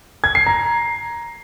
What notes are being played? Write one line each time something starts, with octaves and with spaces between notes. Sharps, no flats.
G#6
C7
A#5